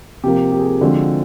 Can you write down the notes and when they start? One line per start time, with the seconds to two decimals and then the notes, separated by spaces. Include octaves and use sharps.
0.24 C3 F3 A#3 G4
0.52 G4
0.59 G#4
0.66 G4
0.81 D3 F3 G#3 C4 F#4